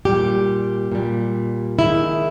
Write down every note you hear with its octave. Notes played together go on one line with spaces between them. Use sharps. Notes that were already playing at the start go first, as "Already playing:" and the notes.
A#2 G3 G4
A#2 G3
G#2 D#3 G#3 E4